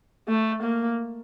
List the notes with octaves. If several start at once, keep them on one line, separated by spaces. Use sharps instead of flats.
A3
A#3